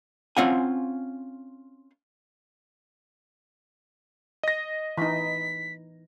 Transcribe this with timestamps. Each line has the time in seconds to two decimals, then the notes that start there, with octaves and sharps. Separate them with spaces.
0.37 C4 C#4 F4 F5 F#5 G#5
4.43 D#5 A#6
4.98 E3 D#4 B6